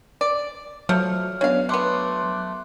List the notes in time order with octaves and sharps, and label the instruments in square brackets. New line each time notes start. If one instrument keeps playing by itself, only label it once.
[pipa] D5
[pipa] F3 A3 [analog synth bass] F#3 [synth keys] F6
[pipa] C#3 F5 [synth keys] B3 D4 C#5
[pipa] A3 B3 [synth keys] C6 D6 F#6